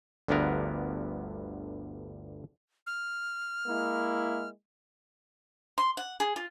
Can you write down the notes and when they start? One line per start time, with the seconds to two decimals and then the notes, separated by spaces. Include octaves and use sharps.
0.28 G1 D2 G2 D3 B3 A#4
2.87 F6
3.66 G#3 A#3 E4
5.78 C6
5.97 F#5
6.20 G#4
6.36 F4